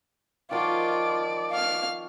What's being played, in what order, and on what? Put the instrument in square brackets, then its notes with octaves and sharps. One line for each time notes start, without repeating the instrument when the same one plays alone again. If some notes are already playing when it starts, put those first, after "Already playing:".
[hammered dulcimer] D#3 F3 F#4 [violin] F4 [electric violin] D5 D6
[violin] F5 F6